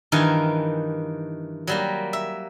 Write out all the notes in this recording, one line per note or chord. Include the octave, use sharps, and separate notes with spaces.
G2 D#3 E3 A#4 F5 G#5
F#3 G3 A#3
E5